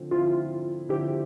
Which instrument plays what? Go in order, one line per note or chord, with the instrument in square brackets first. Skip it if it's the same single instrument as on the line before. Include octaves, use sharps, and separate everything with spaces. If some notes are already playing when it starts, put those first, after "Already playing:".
Already playing: [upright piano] D3 F3 C4
[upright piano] D3 F3 C4 E4 [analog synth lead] F4
[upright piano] D3 F3 C4 E4 [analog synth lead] G4